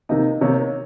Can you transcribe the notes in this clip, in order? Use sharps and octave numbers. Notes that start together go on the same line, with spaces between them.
C3 D#3 A#3 D#4 D#5
C3 D#3 A#3 D#4 C#5